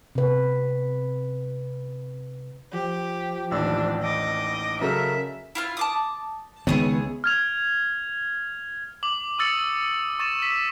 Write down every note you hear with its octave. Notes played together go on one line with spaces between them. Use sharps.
C3 B4
F3 G4
A1 D#2 D4 E6
D#5 D6
C#3 F#3 A4 A#4 E5
E4 F4 F6
A5 D6 D#6
C#2 D#3 B3 E4 G#4 C#5
F6 G#6 F7
D6 F#7
C#6 D#6 E6 A6 C#7 D#7
C#6 A6 E7
E6 B6